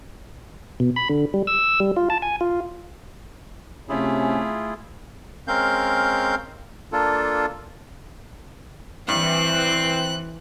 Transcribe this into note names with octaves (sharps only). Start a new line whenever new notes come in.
B2
B5
D3
G3
E6
G3
F4
A5
G#5
F4
C3 A3 C#4 E4 F4 G#4
G#3 C4 C#4 A#4 F5 G6
A#3 D4 F4 A4
G2 E3 C4 F#6